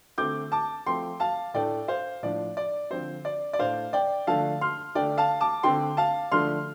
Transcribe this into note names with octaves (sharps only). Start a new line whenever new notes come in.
D3 A3 C4 D6 G6
A5 D6
F3 A3 C4 G5 C6
F5 A5
A2 A3 D4 D5 G5
C5 F5
A2 F3 D4 D5
D5
D3 F3 C4 C5
D5
D5
A2 A3 D4 C5 F5
D5 G5
D3 F3 A3 D4 F5 A5
C6 F6
D3 A3 D4 D5 G5
F5 A5
A5 D6
D3 A3 C4 G5 C6
F5 A5
D3 F3 A3 D4 C6 F6